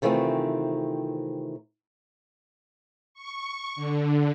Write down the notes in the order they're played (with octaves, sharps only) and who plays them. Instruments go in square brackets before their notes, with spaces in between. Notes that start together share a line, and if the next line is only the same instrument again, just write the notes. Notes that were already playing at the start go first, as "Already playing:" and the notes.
[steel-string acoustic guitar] C3 D#3 E3 A3 C4 F4
[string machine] C#6
D3